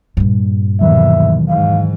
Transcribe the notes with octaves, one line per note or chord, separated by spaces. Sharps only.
G2 A#2
D#2 B2 D#3 E3 F#3 E5
G#2 F5